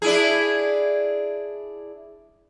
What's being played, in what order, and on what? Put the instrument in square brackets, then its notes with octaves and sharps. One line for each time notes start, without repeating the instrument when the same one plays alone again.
[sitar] D4 E4 G#4